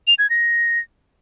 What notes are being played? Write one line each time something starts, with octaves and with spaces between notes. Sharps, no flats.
F7
G#6
A#6